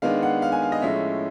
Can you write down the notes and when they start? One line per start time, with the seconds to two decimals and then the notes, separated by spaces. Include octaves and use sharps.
0.02 D#3 G#3 B3 D4 F5
0.23 F#5
0.42 F5
0.52 G#5
0.62 F5
0.72 D#5
0.82 A2 F3 G#3 C#4 E5